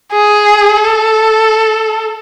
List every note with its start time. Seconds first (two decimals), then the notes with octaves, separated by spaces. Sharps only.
0.13 G#4
0.77 A4